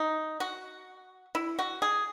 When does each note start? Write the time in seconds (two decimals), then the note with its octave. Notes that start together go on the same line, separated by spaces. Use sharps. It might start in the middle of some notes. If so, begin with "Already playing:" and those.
Already playing: D#4
0.40 F#4
1.35 E4
1.59 F#4
1.82 G#4